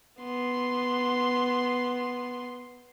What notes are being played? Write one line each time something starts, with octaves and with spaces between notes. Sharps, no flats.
B3 C6